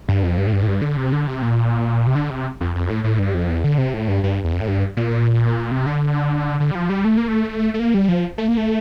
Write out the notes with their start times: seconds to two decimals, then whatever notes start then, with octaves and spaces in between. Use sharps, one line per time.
0.09 G2
0.23 F2
0.38 G2
0.47 A2
0.53 G2
0.63 A2
0.67 G2
0.82 D3
0.97 C3
1.12 D3
1.27 C3
1.42 A#2
2.07 C3
2.15 D3
2.30 C3
2.61 F2
2.75 F2
2.89 A2
3.04 A2
3.19 G2
3.34 F2
3.49 E2
3.64 D3
3.78 C3
3.94 A2
4.08 G2
4.23 G2
4.44 E2
4.52 F2
4.61 A2
4.68 G2
4.97 A#2
5.71 C3
5.86 D3
6.60 D3
6.71 G3
6.75 F3
6.89 G3
7.05 A3
7.17 A#3
7.28 A3
7.74 A3
7.79 A#3
7.94 G3
8.09 F3
8.38 A3
8.48 A#3
8.57 A3